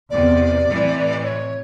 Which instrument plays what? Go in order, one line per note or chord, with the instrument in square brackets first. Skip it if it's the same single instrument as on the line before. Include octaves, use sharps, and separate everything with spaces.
[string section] E2 C3 [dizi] D5
[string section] A2 C3 E3
[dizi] C#5